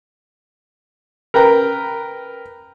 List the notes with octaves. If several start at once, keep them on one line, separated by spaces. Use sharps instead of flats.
A#4 B4 G5 A#5